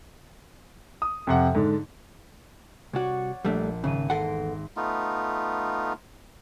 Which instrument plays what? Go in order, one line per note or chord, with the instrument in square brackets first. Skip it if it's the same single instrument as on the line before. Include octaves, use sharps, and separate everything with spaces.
[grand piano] D#6
F2 C3 F#5
G#2 D3
[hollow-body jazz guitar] C2 F#4 [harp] C#5 D5 F#5
[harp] A#1 [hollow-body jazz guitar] G3 A3 D4
[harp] G#1 D#7 [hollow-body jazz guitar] C#3
[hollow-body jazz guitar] E2 A4 F#5 [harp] C6 A#6 D7
[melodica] A3 B3 D#4 F4